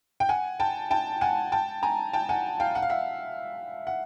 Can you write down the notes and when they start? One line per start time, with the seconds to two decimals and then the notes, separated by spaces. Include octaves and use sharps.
0.20 G5
0.29 F#5 G#5
0.60 G5 A5
0.91 G5 A5
1.21 F#5 G#5
1.52 G5 A5
1.83 G#5 A#5
2.13 G5 A5
2.29 F#5 G#5
2.60 F5 G5
2.75 F#5
2.82 F5
2.90 E5 F#5
3.87 F#5